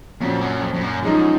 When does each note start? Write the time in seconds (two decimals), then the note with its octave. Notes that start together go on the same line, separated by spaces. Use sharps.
0.21 F2 A#2 F#3 C#4
0.41 F#2
0.61 F2
0.74 F2
0.81 F#2
1.03 F#2 F3 G#3 D#4